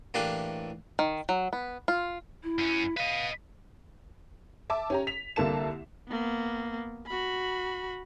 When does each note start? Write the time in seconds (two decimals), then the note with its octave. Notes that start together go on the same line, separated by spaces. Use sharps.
0.14 A2 E3 A#3 D4 G4 C6
0.99 D#3
1.29 F#3
1.53 B3
1.88 F4
2.44 E4
2.59 F#2 C#4
2.97 B4 D#5 F5
4.70 E5 A5 D6
4.90 C#4 G4 A#5
5.07 B6 F7
5.36 C2 D3 A#3 A5 E7
6.09 A#3 B3
7.06 F#4 B5